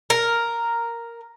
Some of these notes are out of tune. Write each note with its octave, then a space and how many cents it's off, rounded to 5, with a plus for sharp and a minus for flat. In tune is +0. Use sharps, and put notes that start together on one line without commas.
A#4 +0